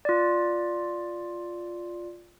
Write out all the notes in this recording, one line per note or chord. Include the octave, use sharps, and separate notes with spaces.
F4 D5